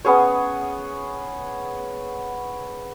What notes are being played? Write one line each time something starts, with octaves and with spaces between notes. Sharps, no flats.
B3 C#4 G#4 C#5